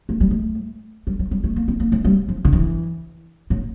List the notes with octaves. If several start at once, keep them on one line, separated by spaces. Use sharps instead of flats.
A3
G3
A3
G3
G3
G3
A3
A#3
C4
A#3
A3
G3
F3
D3
E3
A2